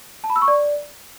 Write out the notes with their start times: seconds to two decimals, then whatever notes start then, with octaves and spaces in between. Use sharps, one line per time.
0.24 A5
0.30 B5
0.36 E6
0.42 C#6
0.48 D5